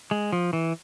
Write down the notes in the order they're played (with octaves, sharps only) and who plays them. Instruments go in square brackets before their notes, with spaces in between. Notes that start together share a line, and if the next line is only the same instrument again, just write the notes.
[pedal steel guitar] G#3
F3
E3